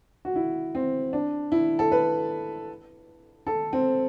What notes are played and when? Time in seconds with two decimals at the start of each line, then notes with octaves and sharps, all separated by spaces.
0.25 F#4
0.36 E4
0.75 C4
1.13 D4
1.52 E4
1.79 A4
1.92 B4
3.47 A4
3.73 C4